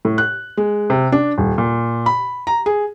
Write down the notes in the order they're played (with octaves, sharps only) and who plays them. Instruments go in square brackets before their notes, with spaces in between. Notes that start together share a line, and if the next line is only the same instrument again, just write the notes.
[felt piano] A2
F#6
G#3
C3
D4
D#1
A#2
B5
A#5
G#4